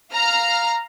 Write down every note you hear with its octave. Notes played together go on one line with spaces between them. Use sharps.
F5 A#5 F6